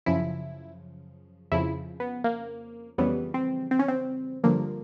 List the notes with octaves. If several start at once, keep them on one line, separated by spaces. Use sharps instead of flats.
F#2 C#3 F3 E4
F2 C#3 F3 E4
B3
A#3
F2 C#3 E3 G3 B3
C4
C4
C#4
C4
G2 D3 F3 A#3